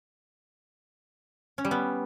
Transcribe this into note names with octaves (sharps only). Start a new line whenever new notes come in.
C#4
G3
B3